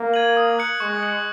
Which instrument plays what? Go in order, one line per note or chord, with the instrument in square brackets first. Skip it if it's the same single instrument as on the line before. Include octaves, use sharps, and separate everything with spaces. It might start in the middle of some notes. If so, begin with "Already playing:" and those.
Already playing: [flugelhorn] A#3
[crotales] G#6 D#7 F#7
D#6
F#6 C#7 F#7
[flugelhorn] G#3 [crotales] C#6
[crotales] F#6 C#7 F#7